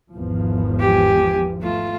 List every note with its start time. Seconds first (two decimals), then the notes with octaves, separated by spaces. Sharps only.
0.12 G#1 E2 F3
0.80 G4 G#5
1.62 A3 F4